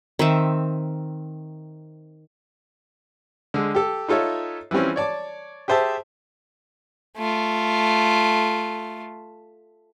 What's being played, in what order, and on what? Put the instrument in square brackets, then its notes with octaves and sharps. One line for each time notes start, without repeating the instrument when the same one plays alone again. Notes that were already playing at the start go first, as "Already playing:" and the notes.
[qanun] D#3 C4 E5
[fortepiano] D3 G#3
G4 A4
D#4 F4 A4 C#5 E5
E3 F3 G3 C4 C#4
C#5 D5 A5 D6
G4 G#4 C5 E5 A5 E6
[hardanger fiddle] A3 F4